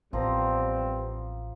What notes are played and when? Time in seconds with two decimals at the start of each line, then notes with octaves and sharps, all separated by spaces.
0.13 A1 F3 G3 B3 C4 A#5